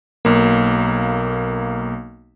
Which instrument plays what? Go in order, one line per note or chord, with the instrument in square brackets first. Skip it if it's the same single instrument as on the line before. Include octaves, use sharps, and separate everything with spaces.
[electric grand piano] B1 A#3